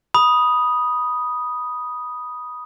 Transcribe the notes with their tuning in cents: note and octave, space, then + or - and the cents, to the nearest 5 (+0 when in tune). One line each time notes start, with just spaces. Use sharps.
B5 -15 D#6 +0